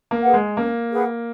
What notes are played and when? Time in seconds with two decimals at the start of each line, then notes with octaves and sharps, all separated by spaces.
0.11 A#3
0.22 G#4 B4 F#5
0.33 G#3
0.57 A#3 C#4
0.91 G#4 B4 F#5